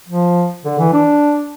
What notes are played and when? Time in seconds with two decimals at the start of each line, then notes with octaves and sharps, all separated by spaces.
0.08 F3
0.65 D3
0.79 E3
0.93 D4